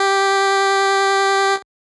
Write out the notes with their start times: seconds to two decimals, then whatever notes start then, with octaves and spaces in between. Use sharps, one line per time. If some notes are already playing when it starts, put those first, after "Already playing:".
Already playing: G4